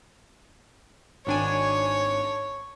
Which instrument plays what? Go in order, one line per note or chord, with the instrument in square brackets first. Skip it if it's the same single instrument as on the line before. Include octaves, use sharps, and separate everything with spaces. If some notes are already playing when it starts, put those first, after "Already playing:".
[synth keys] G#1 D4 G#5 [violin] C#5